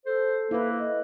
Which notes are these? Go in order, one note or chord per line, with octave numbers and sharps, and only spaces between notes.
A4 C5
A#3 E4 B4
D#5